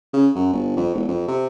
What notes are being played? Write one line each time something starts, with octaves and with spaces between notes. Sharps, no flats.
C#3
F#2
G1
F2
E1
F2
C3